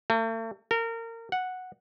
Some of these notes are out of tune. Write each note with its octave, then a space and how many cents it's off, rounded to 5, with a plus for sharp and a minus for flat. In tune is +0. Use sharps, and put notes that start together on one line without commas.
A3 +45
A#4 -25
F#5 -5